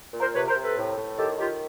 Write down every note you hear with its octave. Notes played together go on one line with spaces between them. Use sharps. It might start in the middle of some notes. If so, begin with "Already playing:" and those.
A#2
A#4 C5
C3 B4 C#5
A#4 C5
C3
A4 B4
A2
A2
D#3 G4 A4
D#3 F4 G4